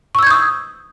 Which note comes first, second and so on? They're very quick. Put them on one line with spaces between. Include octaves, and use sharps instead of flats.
C#6 E6 G#6 G6 D#6